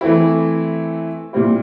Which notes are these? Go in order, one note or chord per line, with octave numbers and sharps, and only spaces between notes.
E3 A3 C4 E4
A#2 G3 C4 E4